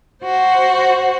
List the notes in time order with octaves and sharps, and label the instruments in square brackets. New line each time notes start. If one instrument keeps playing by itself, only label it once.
[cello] F#4 C5